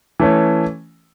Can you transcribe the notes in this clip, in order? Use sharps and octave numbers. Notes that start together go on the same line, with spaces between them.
E3 A3 C#4